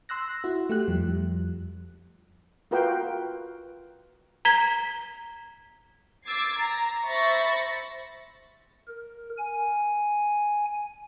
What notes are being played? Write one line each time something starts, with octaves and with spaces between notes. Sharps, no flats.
C6 E6 F#6 A#6
E4 F#4
A3 G4 F#6
F2 F3 G3
F4 F#4 A#4 B4 F5 G5
A#5 G#6 B6 G7
D6 E6 G#6 A6 C7
A#5
C5 E5 B5 C#6 A6 A#6
A#4
G#5